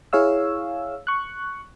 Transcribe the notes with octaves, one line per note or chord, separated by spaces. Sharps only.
E4 G#4 C#5 F5 E6
C#6 F#6